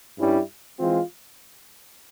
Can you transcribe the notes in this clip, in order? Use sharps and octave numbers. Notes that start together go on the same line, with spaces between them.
G2 G3 C#4 E4
E3 G#3 C4 F4